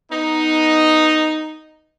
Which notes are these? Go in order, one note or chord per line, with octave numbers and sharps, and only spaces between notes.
B3 D#4